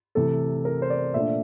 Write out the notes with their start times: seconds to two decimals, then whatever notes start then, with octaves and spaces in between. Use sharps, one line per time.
0.15 C3 E3 A3 A4
0.65 A#4
0.82 C5
0.90 D5
1.14 A#2 A3 D4 E5